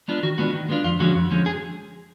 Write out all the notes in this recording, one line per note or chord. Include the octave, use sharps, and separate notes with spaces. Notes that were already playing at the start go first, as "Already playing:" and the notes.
G#3 B3 D4 F4
D#3 F#4
G#3 B3 D4 F4 F#4
D#3
G#3 B3 D4 F4
F2 F4
D3 F3 G#3 C#4 F#4
F2
D3 F3 G#3 C#4
G#4